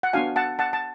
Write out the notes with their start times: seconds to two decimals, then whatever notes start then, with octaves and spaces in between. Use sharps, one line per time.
0.03 F#5
0.13 B3 D4 F#4 F5 G#5
0.36 F#5 A5
0.59 F#5 A5
0.73 A5